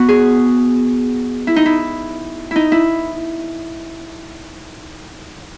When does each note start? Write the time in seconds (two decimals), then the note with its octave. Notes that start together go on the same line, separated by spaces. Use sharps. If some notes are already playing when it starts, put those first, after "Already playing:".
Already playing: B3 F#4
0.09 G#4
1.47 E4
1.56 D#4
1.66 E4
2.51 D#4 E4
2.72 E4